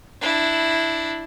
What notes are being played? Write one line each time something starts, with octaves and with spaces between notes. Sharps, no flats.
D4 E4